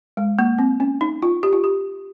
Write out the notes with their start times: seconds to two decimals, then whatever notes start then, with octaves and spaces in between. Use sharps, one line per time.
0.17 G#3
0.39 A#3
0.59 C4
0.80 C#4
1.01 D#4
1.22 F4
1.43 G4
1.53 F4
1.64 G4